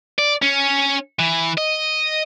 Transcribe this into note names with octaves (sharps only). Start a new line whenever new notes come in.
D5
C#4
E3
D#5